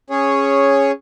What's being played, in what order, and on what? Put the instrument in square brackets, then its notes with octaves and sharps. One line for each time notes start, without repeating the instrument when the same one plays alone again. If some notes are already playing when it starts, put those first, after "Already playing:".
[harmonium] C#4 G#4 C#5